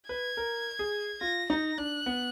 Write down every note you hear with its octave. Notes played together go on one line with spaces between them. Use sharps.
B4 G#6
A#4
G#4
F4 A#6
D#4 A#6
D4 F#6
B3